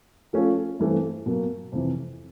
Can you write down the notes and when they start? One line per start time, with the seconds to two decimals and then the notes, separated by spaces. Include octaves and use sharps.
0.33 F3 A3 C#4 F4 A4
0.79 G2 E3 A3 C4
1.26 B2 F#3 A#3
1.72 F2 C3 E3